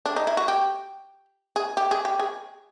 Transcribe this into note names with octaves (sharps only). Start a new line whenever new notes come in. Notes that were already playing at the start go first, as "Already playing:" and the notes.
D4
D#4
E4
F#4
G4
G#4
G4
G#4
G4
G#4